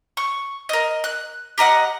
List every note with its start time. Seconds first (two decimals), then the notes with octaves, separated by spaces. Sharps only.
0.17 C#6
0.69 A#4 D#5
1.04 F#6
1.58 G4 A#4 D#5 F#5